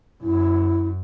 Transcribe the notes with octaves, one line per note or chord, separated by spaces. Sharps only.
F#2 E4